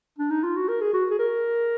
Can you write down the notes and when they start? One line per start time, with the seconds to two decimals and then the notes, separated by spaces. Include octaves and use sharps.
0.18 D4
0.30 D#4
0.43 F4
0.56 F#4
0.68 A#4
0.81 G#4
0.93 F#4
1.10 G#4
1.19 A#4